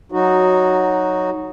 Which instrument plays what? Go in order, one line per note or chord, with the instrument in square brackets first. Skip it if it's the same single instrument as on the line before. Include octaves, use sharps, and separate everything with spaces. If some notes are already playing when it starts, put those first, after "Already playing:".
[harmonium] F#3 D#4 F#4